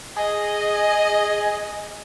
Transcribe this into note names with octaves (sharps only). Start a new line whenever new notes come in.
G#4 D#5